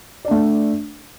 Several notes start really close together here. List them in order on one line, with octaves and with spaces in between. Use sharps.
D5 D4 A3